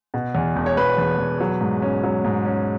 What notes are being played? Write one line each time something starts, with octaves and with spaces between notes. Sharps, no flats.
B2
E2
E1
C#5
E1 B4
E1
E1
F#3
G#2
C#4
F#3
G#2
C#4